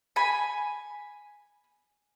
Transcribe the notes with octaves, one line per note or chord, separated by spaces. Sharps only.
G#5 B5